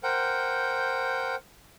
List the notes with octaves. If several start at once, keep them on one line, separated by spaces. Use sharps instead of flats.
A#4 C5 F#5 G5 G6